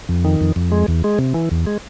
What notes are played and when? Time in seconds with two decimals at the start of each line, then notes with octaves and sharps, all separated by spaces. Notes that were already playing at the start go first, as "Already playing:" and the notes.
0.09 F2
0.25 D#3
0.41 F2
0.56 F2
0.72 G#3
0.88 E2
1.04 G#3
1.19 C3
1.34 E3
1.51 E2
1.67 G#3